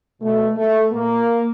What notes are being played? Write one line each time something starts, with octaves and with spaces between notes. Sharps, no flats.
B2 A3
A3
A#2 A#3